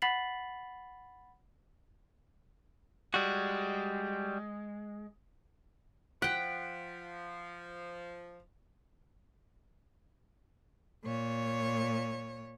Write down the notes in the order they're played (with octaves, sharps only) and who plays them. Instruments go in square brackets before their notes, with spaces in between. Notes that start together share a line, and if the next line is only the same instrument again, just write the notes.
[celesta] F#5 B5 A6 B6 C7 F#7
[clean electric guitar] G3 F#4 [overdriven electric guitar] G#3
[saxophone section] F3 [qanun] F#5 G5 [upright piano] F#6 [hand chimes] B6 D7
[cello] A#2 C#5